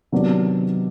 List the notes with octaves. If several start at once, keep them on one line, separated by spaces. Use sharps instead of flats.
C3 D#3 F#3 B3 D4